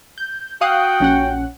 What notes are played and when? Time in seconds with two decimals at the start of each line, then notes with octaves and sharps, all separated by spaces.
0.18 G6
0.61 F#4 F5 G5 D#6 F#6
1.00 A#1 C#4 F#5